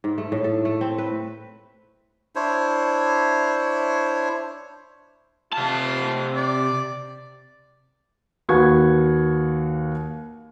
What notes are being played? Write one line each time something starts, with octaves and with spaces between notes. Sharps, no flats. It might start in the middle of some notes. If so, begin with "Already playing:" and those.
G#2
A3
A2
A4
A3
C4
B4
D4 E4 C5 C#5
C3 F4 A5
D5
D#2 F#4 B4 C#6 G#6